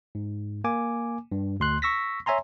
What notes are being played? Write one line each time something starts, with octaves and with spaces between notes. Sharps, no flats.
G#2
A#3 G#5 D6
G2
D2 C6 F#6
C#6 E6 A#6 B6
C#5 E5 G#5 A#5 C6